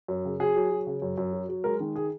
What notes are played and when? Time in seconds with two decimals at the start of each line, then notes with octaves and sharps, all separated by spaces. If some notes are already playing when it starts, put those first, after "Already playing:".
0.08 F#2
0.25 C#3
0.40 F#3 G#4
0.56 F#3
0.71 F#3
0.87 C#3
1.02 F#2
1.18 F#2
1.33 F#3
1.49 F#3
1.64 G#3 A#4
1.80 D#3
1.96 G#4